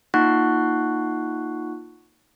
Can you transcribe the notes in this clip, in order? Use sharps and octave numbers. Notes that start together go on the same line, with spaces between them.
A#3 D#4 F4 F#5 C#6 F#6